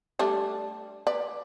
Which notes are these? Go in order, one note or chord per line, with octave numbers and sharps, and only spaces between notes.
G3 A3 D4
B4 D5